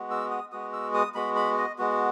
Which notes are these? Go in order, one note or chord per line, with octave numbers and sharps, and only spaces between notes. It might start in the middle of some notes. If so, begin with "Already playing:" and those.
Already playing: G#3 B3 F#4
E6
D#6
G#3 B3 F#4 D#6
E6
D#6
G#3 B3 F#4 B5
B5
D#5
G#3 B3 F#4